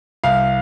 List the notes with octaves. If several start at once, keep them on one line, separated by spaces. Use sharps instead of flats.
C2 F5